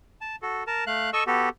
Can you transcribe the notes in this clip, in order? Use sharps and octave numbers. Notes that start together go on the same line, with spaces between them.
A5
F#4 A4
A#4 A5
A3 F5 F#6
A4 D#5 C#6 E6
B3 F#4 G4 A4